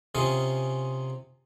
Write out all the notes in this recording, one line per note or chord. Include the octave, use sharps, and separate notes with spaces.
C3 C#4 F4 G#4 D#5 C#6